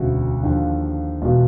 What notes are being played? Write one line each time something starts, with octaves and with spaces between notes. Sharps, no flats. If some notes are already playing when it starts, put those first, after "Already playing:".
Already playing: E1 D2 C#3 F#4
D#2 D3 F3
E1 B2 F4